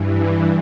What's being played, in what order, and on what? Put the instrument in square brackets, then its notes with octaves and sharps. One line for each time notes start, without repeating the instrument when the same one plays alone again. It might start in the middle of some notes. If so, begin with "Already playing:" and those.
Already playing: [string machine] G2 E3